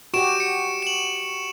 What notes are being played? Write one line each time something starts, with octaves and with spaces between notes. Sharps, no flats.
F#4 G4 C#6 D7 E7
C#7
E7 F#7